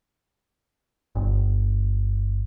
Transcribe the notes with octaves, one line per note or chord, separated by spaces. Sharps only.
G1